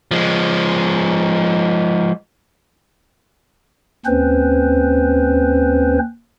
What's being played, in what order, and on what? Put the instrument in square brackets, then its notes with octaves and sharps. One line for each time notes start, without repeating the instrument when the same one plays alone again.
[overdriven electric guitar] F3 G#3
[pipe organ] D#2 C4 C#4 B4 C5